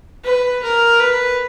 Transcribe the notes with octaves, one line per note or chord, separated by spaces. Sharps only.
B4
A#4
B4